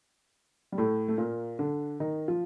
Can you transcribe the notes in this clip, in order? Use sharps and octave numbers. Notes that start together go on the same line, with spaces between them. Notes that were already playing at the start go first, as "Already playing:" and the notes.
G3
A2 A3
A3
A#2 A#3
D3 D4
D#3 D#4
F3 F4